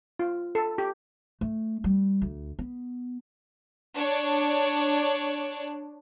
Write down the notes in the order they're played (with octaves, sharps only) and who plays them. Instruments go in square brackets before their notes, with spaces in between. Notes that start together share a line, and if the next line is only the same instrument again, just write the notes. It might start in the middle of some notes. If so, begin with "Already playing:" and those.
[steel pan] F4
A4
G4
[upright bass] A3
G3
D2
B3
[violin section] D4 C#5 D5